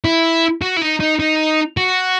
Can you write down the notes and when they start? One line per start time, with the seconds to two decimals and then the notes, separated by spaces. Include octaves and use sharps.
0.05 E4
0.62 F#4
0.77 E4
0.82 D#4
1.01 D#4
1.20 D#4
1.77 F#4